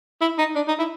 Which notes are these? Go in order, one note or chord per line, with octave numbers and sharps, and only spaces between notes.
E4
D#4
D4
D#4
E4